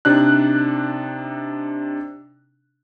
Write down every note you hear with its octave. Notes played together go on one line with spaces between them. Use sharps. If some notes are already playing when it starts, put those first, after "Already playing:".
C3 D4 D#4 F#6